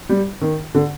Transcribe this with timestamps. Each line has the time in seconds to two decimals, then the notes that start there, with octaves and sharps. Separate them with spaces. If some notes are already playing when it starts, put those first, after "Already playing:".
0.09 G3
0.41 D#3
0.74 D3